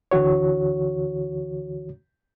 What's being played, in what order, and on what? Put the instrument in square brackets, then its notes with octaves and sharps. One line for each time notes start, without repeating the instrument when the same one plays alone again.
[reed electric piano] D2 D3 E3 F#4 C#5